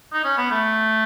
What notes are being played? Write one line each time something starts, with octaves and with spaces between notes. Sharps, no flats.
D#4
C#4
B3
A3